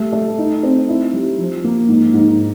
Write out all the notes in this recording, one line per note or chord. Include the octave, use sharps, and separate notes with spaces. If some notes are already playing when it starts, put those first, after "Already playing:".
Already playing: G3 A3
A3
D#4
C4
E4
G3
F3
A#3
G#2
G#2